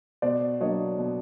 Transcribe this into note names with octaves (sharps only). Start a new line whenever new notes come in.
B2 C5 D5
F#3 A#3 D4 C#5 D#5
B2